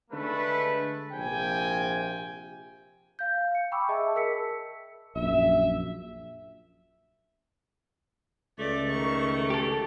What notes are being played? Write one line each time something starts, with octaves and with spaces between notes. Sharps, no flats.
D3 G#3 A3 B4
A#1 C3 G5 G#5
F5 G6
C#7
G5 G#5 B5 C#6 D6 E6
G#4 D#5 E5 A5
A#4 E6 B6 C#7
A#1 F#2 E5
C#2 A3 D5
D#3 C#6
G4 A4